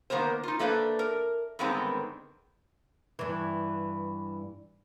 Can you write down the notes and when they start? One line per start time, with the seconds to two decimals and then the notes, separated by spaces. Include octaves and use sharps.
0.10 D#3 A#3 B3 A#4 C5
0.43 D#4 F4
0.59 A3 A#3 D4 B4 C5
0.99 A#4
1.59 G2 D3 D#3 G#3 B3 C4
3.19 G2 E3